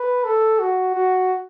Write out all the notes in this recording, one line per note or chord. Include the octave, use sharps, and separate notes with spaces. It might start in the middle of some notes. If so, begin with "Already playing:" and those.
Already playing: B4
A4
F#4
F#4